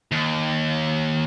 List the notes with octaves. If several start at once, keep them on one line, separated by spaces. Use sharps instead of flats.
D#2